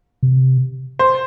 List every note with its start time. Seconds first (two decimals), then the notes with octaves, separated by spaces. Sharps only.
0.23 C3
0.99 C5